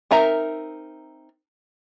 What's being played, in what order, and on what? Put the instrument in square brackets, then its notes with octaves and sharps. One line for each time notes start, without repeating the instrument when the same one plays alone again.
[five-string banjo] C4 D#4 A#4 E5 A#5